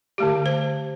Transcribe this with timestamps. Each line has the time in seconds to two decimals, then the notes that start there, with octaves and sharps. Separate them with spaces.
0.18 D3 A3 G4
0.46 C5